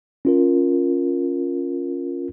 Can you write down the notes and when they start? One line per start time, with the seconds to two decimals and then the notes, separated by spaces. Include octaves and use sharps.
0.25 C#4 F4 A#4